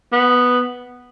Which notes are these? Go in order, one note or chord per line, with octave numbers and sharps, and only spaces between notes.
B3